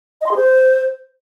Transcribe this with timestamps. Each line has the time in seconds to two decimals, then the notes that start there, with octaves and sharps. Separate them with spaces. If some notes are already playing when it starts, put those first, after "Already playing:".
0.21 D#5
0.26 C6
0.31 G#4
0.36 C5